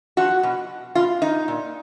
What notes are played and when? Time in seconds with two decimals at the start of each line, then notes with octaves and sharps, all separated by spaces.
0.17 F3 F#4
0.43 B2
0.95 B2 F4
1.22 D#4
1.48 A#2